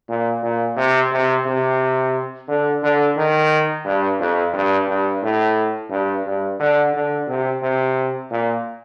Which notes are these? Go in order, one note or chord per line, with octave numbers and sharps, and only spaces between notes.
A#2
A#2
C3
C3
C3
D3
D3
D#3
G2
F2
G2
G2
A2
G2
G2
D3
D3
C3
C3
A#2